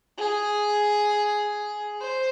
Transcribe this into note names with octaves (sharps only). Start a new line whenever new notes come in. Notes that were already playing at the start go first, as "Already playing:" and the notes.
G#4
C5